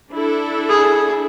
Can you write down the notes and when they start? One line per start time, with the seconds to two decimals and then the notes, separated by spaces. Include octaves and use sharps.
0.13 D4 E4 A4
0.69 G#4